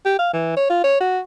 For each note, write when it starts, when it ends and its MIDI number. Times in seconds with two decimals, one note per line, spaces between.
0.06 0.16 67
0.18 0.29 77
0.33 0.54 52
0.57 0.69 73
0.70 0.81 65
0.84 0.99 73
1.00 1.19 66